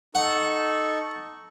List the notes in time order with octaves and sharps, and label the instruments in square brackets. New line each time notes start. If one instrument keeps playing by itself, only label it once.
[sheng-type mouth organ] D#4 C#6 [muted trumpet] A4 [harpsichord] F#5